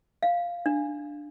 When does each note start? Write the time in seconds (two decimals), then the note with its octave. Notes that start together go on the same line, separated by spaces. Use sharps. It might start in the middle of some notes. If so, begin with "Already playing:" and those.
0.23 F5
0.66 D4